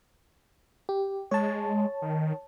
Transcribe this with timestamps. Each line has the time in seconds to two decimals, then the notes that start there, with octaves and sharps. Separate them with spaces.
0.89 G4
1.31 G#3 C#5 A5
2.02 D#3